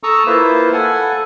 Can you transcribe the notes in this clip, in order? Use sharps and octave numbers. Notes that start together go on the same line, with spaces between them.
A4 A5 A#5 C#6 D#6 E6
A#3 E4 F4 B4 C5
A4 F#5 G#5